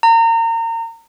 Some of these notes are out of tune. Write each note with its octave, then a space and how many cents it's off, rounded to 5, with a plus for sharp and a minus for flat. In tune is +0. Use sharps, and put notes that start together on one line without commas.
A#5 -30